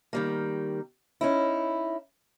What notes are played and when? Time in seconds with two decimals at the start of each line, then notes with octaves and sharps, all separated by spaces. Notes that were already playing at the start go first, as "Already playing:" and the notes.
0.13 D#3 G3 A#3
1.21 C#4 D#4 E4